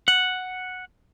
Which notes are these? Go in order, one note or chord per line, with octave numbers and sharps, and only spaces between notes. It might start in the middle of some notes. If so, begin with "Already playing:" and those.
F#5